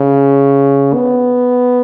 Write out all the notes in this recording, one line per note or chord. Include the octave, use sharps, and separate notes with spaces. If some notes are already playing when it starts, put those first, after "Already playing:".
Already playing: C#3
B3